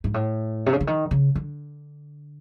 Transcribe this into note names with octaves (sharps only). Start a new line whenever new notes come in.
G#2
A2
C3
C#3
D3
D#3
C#3
D3